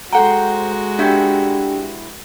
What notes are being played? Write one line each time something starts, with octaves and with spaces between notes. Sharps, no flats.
G#3 F#4 A4 C5 F#5 G5 A#5
B3 D4 E4 G4 G5 G6